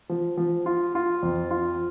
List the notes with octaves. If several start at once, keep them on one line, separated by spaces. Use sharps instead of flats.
F3
F3
F4
F4
F2
F4